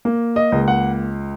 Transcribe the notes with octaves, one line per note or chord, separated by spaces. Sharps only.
A#3
D#5
C#2
F#5